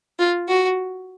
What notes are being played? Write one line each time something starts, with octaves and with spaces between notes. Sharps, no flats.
F4
F#4